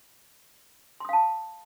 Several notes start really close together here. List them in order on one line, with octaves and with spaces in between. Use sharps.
C6 D#6 F5 A5